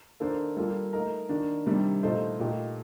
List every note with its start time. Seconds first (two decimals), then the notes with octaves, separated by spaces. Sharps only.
0.20 D#3 A#3 D4 A4 C5
0.57 G3 A#3 F4 A4
0.93 A3 D#4 A#4
1.29 D#3 A#3 D4
1.66 C3 D#3 G3 D4
2.03 A#2 A3 D#4 A4 C5
2.39 A#2 A3 D#4 G4